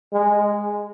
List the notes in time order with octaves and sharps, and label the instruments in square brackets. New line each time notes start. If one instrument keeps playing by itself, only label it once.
[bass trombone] G#3